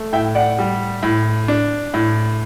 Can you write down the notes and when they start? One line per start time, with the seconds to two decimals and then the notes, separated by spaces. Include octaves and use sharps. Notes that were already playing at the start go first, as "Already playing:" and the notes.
Already playing: A3
0.12 A2 E5 G5
0.35 D5 F#5
0.59 G3
1.03 A2
1.48 D4
1.94 A2